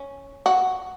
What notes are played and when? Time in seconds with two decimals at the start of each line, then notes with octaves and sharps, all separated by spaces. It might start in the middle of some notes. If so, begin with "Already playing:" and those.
Already playing: C#4
0.46 F#4